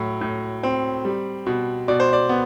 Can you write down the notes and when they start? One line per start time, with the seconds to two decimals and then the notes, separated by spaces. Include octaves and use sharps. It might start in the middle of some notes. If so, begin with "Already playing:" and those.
Already playing: A2 F#3
0.21 A2
0.63 C4
1.05 G3
1.47 B2
1.88 B2 D5
2.00 C5
2.13 D5
2.29 B3